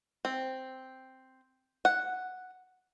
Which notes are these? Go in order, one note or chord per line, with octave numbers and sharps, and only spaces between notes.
C4
F#5